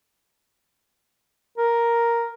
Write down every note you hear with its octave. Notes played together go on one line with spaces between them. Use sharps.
A#4